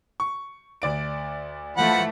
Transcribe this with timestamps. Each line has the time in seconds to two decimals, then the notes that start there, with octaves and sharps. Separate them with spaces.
0.20 C#6
0.82 D2 D5 D7
1.77 E3 F3 A3 F#5 B5